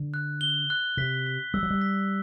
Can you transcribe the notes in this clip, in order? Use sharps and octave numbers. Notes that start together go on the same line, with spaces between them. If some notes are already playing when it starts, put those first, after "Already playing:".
Already playing: D3
F#6
G7
F#6
C3 B6
B6
G3 E6
F#3
G3
B6